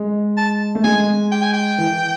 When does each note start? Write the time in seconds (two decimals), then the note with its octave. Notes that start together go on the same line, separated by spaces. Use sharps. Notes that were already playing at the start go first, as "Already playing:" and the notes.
Already playing: G#3
0.37 A5
0.75 A3
0.84 G#3 G#5
1.32 G5
1.43 G#5
1.53 G5
1.78 E3